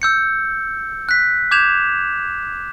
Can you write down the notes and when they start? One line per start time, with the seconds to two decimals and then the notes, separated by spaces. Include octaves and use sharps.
0.02 E6 G6 C#7
1.09 F#6 B6
1.51 D6 G6 G#6 E7 F7